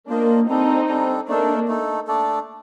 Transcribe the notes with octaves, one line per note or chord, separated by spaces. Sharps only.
A#3 D4 F4 C5 D#5
G3 C4 D4 D#4 A4
G3 D4 A4
A3 A#3 D4 D#4 A4
A3 D#4 A4
A3 D4 A4 D5